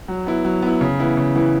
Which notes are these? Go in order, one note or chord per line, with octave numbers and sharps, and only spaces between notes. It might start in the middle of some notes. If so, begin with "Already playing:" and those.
F#3
B3 E4
F#3
B3 E4
C#3
E3 B3 E4
C#3
E3 B3 E4